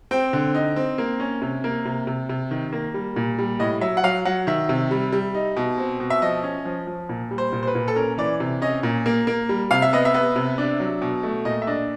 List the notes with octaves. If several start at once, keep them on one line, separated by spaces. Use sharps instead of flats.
C4 G5
D3
D#4
C4
A#3
C#4
C3
A#3
C3
C3
C3
D#3
A#3
G3
A#2
G3
A2 D#5
F#3 E5
F#5
F#3 F5
F#3 F#5
D#3 E5
C3
G3
G3
D#4
B2
C4
B2
E5
F3 D#5
C#4
F3
F3
A#2
G3
C5
A#2
C5
B4
A#2
A4
C#4 A#4
E3 D5
C3
C#4 D#5
A#2
A#3
A#3
G3
C3 F5
E5
B3 D#5
E5
B3
C3
D4
F#3
B2
A3
A#2 D#5
E5
D4 D#5